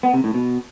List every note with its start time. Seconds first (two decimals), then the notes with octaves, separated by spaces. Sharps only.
0.03 B3
0.14 C3
0.24 A2
0.34 B2